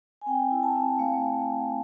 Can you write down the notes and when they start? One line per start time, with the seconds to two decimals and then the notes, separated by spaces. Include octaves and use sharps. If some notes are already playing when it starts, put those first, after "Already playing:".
0.21 G#5
0.26 C4 G5
0.51 E4
0.63 A5
0.76 C4
0.99 A3 F5